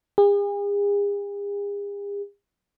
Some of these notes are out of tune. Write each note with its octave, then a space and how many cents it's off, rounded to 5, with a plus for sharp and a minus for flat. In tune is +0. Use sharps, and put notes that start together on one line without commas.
G#4 -45